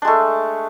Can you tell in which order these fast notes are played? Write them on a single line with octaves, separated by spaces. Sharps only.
D4 G#3 A3